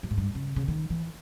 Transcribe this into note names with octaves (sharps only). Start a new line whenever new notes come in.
G2
G#2
G2
C#3
C#3
D#3
E3